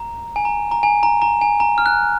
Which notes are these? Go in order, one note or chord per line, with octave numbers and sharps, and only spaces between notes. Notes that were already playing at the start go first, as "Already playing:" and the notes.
Already playing: A#5
G#5
A#5
A#5
G#5
A#5
A#5
G#5
A#5
F6
F#6